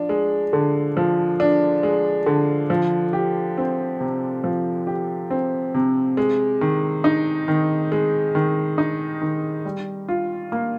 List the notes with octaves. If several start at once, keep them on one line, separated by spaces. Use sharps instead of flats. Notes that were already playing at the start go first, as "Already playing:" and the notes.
Already playing: F3 D4
G#3
D3
F3
D4
G#3
D3
F3
G4
C4
C3
F3
G4
C4
C3
G#3
D#3
D#4
D#3
G#3
D#3
D#4
D#3
G3
F4
A#3